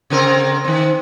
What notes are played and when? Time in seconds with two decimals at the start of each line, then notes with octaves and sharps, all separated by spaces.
0.10 C#3 C4 A#4
0.64 D#3 C4